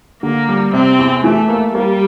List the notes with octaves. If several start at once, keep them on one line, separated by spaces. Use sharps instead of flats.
D3 A#3
G3
C3 C4
E2
E3 A3
A#3
G3 A#3